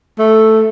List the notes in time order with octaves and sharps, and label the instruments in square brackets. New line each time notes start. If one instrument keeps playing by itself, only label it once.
[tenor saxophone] A3